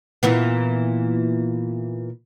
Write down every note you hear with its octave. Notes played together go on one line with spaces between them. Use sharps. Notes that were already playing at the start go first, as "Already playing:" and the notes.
A#2 E3 B3